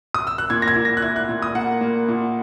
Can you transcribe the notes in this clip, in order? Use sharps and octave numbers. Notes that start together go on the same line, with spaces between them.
D#6
E6
F#6
A#2 G#6
A#6
G#6
A#2
A#6
F#6
E4 G#6
F#6
A#2
D#6
A#3 F#5
A#3
A#2